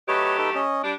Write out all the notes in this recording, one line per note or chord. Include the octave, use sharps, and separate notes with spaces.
F#3 A3 G4 B4 C#5 D#5
D#4 A4 B4
C#4 D#5
G3 D4